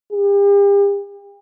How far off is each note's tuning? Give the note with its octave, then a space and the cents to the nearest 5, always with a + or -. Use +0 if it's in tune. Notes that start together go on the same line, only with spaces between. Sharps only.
G4 +40